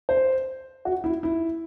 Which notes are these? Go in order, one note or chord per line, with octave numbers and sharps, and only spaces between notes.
C5
F#4
E4
E4